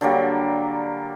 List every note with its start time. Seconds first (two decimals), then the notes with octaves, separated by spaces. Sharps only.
0.01 D3 F#3 G3 A#3